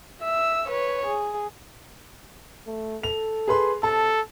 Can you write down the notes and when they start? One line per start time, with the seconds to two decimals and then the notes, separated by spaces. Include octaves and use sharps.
0.22 E5 E6
0.69 B4 C#5
1.06 G#4
2.67 A3
3.03 A4 F7
3.48 G#4 B4 C6
3.83 C3 A4 A5